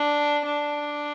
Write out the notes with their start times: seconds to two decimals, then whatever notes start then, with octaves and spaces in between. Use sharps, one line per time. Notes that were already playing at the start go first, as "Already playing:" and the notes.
Already playing: D4
0.45 D4